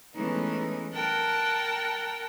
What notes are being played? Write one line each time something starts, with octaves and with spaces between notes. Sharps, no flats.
E3 G#3 A3 B3 C#4 D#4
A#4 F#5 G5 A5